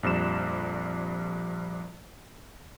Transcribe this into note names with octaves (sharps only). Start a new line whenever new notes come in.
A#1 F2 G3 E7